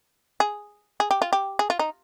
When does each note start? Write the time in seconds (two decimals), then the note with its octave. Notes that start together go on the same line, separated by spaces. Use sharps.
0.40 G#4
1.00 G#4
1.11 G4
1.22 F4
1.33 G4
1.59 G#4
1.70 F4
1.79 D#4